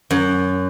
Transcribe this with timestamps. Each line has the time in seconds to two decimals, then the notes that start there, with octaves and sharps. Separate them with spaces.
0.10 F#2